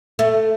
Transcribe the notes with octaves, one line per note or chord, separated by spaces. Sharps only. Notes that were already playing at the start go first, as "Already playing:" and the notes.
A3